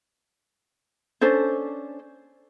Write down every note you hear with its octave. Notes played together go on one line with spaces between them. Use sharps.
C#4 D4 A4 C5